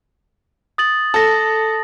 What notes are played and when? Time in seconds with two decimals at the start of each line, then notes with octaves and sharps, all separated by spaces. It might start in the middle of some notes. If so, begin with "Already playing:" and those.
0.78 D#6 A6 F#7
1.14 A4 A5 A#6